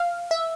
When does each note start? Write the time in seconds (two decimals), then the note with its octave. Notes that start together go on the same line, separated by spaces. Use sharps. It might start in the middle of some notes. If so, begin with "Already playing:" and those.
Already playing: F5
0.31 E5